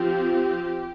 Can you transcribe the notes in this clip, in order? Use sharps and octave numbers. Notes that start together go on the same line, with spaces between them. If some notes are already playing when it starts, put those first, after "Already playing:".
Already playing: F3 C4 G4